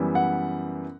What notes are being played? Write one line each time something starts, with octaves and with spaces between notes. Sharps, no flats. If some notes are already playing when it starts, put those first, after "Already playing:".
Already playing: F#2 E3 G3 B3
F#5